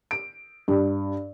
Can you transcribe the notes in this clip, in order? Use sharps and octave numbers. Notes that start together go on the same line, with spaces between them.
D7
G2